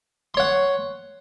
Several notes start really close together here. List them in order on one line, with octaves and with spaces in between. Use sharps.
C6 C#5 F#5